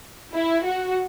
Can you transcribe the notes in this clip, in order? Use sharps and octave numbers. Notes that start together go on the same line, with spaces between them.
E4
F#4